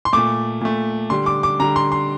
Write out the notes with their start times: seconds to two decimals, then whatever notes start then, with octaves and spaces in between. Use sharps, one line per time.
0.05 C6
0.13 A#2 A3 D6
0.61 A#2 A3
1.10 D3 G3 C6
1.26 D6
1.43 D6
1.59 D3 G3 A#5
1.76 C6
1.92 C6